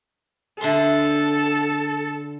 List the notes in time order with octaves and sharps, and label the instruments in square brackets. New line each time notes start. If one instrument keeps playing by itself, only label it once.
[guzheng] D3 E5 C6 [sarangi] A4